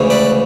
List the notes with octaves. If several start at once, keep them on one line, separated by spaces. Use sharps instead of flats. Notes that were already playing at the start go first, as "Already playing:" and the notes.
Already playing: D2 C#3 E3 G#3
B4 D5